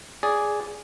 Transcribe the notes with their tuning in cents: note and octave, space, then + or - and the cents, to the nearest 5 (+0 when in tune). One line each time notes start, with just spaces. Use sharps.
G#4 +0 D5 -10